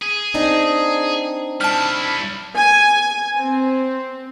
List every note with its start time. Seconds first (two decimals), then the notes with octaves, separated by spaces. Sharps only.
0.02 G#4
0.34 C4 D4 D#4
1.61 G3 E4 A5 F6
2.57 G#5
3.36 C4